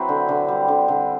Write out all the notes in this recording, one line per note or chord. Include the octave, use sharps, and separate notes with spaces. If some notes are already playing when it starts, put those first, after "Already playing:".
Already playing: F#3 C4 E4 B4
D3
D3
G3
D3
D3